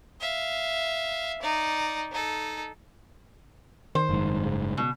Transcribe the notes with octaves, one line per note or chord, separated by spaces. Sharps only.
E5 F5
D#4 D5
D#4 A4
D#3 C5
F#1 G#2
C#3
B2